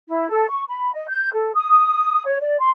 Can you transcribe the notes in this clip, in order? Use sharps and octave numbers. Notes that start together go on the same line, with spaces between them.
E4
A4
C#6
B5
D#5
G6
A4
D#6
C#5
D5
C6